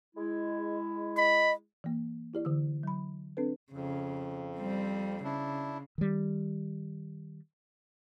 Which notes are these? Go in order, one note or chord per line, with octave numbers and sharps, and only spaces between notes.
G#3 E4
D#5 B5
E3 A#3
E4 G4 D5
D3 E3 E6
F#3 B5
C4 D4 A4 B4
F2 C#3
G3 C4
C#3 D4 E4
D#3 G3